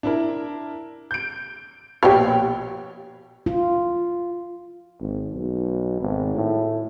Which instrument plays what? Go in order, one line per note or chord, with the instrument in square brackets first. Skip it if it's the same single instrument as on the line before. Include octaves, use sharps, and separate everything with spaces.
[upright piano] D4 E4 A#4
G6 D7
[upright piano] A#1 B2 C#5 [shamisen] G4 F5
[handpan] F4
[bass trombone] G#1
B1
G#1
A2